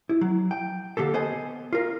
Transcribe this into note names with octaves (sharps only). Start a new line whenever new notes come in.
E4
F#3
G5
D3 A#3 G4 A4
B3 C5 D#5 G#5
F4 A#4